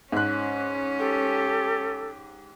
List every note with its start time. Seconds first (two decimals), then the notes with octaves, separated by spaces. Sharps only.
0.12 G#2 C#4 F#6
0.99 G4 A4